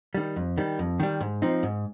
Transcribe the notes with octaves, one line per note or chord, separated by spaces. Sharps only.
D#3 G3
F2
D#3 G3
F2
D#3 G3
G#2
F3 C4 D#4
G#2